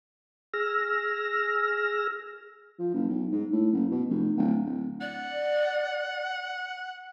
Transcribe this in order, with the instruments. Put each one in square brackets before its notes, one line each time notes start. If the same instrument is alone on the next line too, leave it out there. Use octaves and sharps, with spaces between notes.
[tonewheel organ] G#4 E6 F6 A#6
[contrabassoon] F3
F#1
B1
G#2
A2
F#1
B2
F1
D1
D1
[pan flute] D5 [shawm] F#5